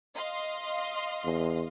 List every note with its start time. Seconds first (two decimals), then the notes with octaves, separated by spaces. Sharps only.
0.15 D#5 F5 C6
1.24 E2